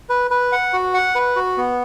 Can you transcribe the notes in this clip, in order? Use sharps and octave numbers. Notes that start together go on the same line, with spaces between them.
B4
B4
F#5
F#4
F#5
B4
F#4
B3